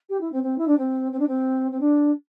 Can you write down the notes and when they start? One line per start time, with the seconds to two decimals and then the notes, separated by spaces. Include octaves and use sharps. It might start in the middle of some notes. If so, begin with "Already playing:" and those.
0.09 G4
0.20 E4
0.32 C4
0.43 C4
0.58 E4
0.67 D4
0.78 C4
1.12 C4
1.19 D4
1.27 C4
1.71 C4
1.80 D4